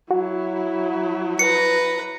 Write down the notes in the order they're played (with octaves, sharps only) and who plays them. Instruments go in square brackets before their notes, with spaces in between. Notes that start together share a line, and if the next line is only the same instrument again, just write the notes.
[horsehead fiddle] F#3 E4 [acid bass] F#4
[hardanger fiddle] B4 A#5 [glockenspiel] C#7